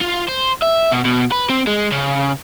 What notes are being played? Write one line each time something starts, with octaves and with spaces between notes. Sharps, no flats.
F4
C5
E5
B2
B2
B4
C4
G#3
C#3